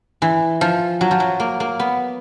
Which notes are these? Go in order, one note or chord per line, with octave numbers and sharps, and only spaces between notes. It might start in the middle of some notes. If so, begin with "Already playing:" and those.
E3
F3
F#3
F3
F#3
A#3
A#3
B3